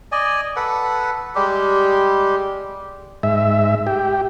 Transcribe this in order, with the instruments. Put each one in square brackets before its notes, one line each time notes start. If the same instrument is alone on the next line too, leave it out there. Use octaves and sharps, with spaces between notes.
[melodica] D5 D#5 G#5
A4 B4 F#5
G3 G#3 G4
[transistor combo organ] G#2 E5
G4